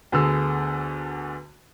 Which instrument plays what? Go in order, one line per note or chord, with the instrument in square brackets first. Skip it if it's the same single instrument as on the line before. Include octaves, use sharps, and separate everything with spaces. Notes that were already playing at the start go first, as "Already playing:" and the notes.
[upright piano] D2 D3 B3 G#4 E6